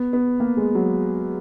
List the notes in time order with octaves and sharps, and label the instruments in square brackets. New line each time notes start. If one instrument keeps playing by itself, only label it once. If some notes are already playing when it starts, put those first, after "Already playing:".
Already playing: [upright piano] B3
B3
A#3
G#3
F#3